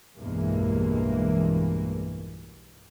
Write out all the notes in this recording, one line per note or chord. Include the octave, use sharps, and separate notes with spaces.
B1 E2 G2 E3 G#3 A#3